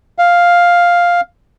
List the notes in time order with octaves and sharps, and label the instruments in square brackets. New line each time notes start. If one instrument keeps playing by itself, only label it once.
[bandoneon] F5